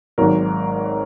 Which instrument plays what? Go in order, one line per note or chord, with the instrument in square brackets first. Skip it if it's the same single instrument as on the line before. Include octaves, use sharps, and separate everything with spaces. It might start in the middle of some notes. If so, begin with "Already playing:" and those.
[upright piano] G#1 G#2 D#3 F#3 A#4